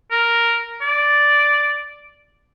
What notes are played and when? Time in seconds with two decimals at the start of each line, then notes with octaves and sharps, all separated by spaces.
0.11 A#4
0.81 D5